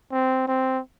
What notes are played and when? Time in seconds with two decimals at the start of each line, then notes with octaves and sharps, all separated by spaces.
0.12 C4
0.47 C4